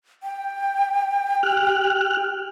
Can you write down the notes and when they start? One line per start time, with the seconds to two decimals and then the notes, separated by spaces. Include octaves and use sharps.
0.23 G5
1.43 G4 F6 F#6